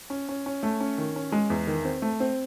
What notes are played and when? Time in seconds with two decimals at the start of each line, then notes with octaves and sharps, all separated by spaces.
0.10 C#4
0.29 C#4
0.46 C#4
0.63 A3
0.80 C#4
0.98 D#3
1.16 C#4
1.32 G#3
1.50 E2
1.67 D#3
1.85 C4
2.02 A3
2.20 C4